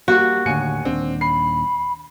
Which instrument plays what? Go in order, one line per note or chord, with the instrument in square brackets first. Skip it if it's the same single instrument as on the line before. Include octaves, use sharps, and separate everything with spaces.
[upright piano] G3 A#3 [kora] F#4
[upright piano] D#2 G#5 C#7 [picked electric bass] A2 D3
[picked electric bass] D#1 D#2 D4 [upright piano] C4
[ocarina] B5 [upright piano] C7